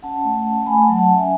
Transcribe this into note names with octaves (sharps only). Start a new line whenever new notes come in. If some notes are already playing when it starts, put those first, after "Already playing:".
C#4 F#5 A5
A3
C#4
A3 G#5 B5
F#5 A5
F#3
F#5 A5
C#4
E5 G#5